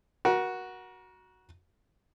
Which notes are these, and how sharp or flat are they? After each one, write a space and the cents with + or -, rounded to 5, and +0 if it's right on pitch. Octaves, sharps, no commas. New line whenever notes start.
F#4 +0 A#4 +35